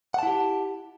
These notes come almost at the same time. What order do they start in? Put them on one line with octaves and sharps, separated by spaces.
F#5 A5 E4 G4